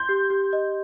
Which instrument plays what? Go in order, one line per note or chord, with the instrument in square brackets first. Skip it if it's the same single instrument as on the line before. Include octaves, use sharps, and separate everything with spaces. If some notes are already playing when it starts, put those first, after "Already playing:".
Already playing: [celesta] C6 [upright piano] G6
[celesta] G4
G4
D#5